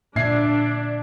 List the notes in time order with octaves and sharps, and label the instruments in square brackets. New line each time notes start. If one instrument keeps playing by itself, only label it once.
[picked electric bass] A#2 D3 [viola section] D4 [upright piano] E5 G#6 C7